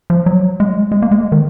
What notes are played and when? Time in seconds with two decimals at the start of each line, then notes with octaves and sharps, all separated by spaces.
0.10 F3
0.26 F#3
0.60 G#3
0.92 G#3
1.02 A#3
1.11 G#3
1.32 D#3